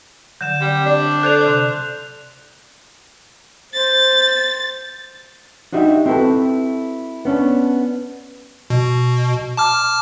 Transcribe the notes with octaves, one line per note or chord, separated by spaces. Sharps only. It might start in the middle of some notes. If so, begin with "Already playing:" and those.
D3 F#3 G6 E7
G3 C4
D4
A4 C5 D5 F#6 G6 F7
C3 C6 D6
C5 A6
D4 D#4 F#4 G4 E5
C4 E4 F#4 A4 B4
B3 C#4 D4
B2
A5 D6 F6